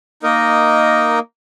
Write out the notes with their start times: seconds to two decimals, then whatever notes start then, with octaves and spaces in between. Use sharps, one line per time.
0.23 A#3 D#4 A#4 D#5